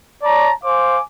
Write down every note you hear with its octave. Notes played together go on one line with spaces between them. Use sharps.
C#5 D5 A5 A#5
C5 F5 G#5 D6